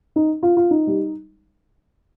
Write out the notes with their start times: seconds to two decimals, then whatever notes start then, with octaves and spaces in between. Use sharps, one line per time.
0.16 D#4
0.43 F4
0.57 F4
0.71 D#4
0.87 G3